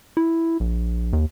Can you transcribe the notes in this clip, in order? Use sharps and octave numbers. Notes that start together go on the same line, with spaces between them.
E4
A#1
D#2